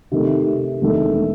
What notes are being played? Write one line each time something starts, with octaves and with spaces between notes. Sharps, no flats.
C3 D#3 A3
E1 E2 D#3 A3